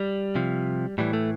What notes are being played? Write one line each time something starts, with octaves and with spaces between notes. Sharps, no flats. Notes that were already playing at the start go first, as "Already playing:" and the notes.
Already playing: G3
C3 F3
A2 E3 G3
A3